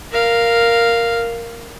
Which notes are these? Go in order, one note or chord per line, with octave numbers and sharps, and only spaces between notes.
A#4 F5